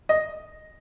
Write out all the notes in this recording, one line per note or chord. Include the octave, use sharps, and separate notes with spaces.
D#5